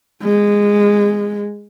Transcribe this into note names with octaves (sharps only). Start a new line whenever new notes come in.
G#3